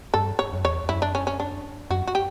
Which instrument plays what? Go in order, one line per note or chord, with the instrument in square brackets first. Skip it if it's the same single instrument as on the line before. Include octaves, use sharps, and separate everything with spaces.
[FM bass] G2 [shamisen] A4
[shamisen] C#5
[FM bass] F#2
[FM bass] E2 [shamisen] C#5
[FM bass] F#2 [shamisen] E4
[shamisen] D4
C#4
C#4
D4
[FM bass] F#2 [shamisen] F#4
[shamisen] F#4
G4